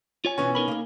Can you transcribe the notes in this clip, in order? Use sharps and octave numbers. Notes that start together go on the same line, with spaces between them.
F4 C#5 G#5
B2 E3 B3 C#4
D#4 A#4 B5
A#3 G#4